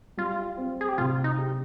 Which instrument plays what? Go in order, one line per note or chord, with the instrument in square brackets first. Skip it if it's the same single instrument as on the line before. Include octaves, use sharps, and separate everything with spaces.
[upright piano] G3 [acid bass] F4
[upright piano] C4
[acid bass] G#4
G4
[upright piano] C3 [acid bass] F4
[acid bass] D#4
[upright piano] G4